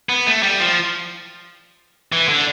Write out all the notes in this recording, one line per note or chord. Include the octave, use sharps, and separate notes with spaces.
B3
A3
G3
F3
E3
D3